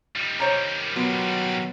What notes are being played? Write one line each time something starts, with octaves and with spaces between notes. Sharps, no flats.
D#3 G3
C5 C#5 A#5
B2 F#3 F4